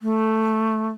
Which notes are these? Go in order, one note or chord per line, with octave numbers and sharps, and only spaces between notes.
A3